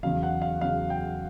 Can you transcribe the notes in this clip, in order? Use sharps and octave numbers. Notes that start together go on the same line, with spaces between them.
E2 C#3 F#3 F5
F#5
F5
E2 C#3 F#3 F5
G5